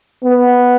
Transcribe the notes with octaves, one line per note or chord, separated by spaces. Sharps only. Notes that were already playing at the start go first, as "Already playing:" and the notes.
B3